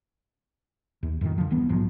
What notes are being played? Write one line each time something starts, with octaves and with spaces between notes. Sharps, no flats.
D#2
F2 A2 C3 D#3
D3 F3
D#1 G2 E3 B3
A#1 G#2 F3 F#3